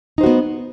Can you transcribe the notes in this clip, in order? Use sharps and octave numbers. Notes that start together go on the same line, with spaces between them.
B3 D#4 F#4 C5